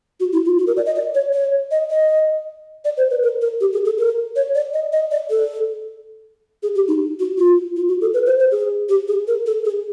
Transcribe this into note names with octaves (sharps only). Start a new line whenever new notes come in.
F#4
E4
F4
F#4
A#4
D5
D#5
D5
C#5
C#5
D#5
D#5
D5
C5
B4
A#4
A#4
G4
G#4
A4
A#4
C#5
D5
D#5
D#5
D5
A4
G#4
G4
D#4
F#4
F4
F4
F#4
A4
B4
C5
C5
G#4
G4
G#4
A#4
A4
G#4